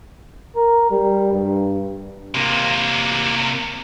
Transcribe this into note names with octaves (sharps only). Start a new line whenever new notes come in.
A#4
G3
G2
C3 A#3